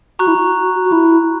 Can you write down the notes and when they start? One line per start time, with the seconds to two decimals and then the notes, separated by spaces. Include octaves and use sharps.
0.19 F#4 A#5 C#6 F#6
0.28 E4
0.36 F#4
0.85 F#4
0.92 E4